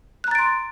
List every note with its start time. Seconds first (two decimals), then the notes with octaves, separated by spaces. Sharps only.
0.24 F#6
0.28 A#5
0.31 A6
0.35 D7
0.39 C6